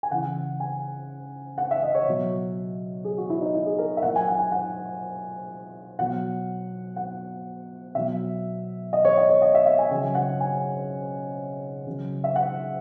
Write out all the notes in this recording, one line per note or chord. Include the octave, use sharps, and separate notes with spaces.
G#5
C#3 E3 F#5
G#5
F#5
E5
D#5
C#5
B2 F#3
G#4
F#4
E4
D#4
E4
G#4
A#4
E5
A#2 F#3 F#5
G#5
F#5
G#5
F#5
B2 F#3 F#5
F#5
B2 F#3 E5
D#5
C#5
D#5
C#5
D#5
E5
E5
G#5
C#3 F#3 G#5
F#5
G#5
C#3 F#3
E5
F#5